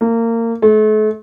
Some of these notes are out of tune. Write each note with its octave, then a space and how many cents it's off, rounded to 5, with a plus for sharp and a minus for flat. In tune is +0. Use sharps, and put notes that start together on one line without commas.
A#3 -25
A3 -40